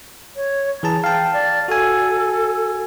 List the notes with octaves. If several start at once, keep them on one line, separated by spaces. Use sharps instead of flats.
C#5
E3 G#4 A5 A#5
F5 G5 A5
D5
F#4 A4 G#5